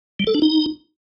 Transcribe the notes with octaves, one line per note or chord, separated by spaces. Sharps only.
G3
A4
D4
D#4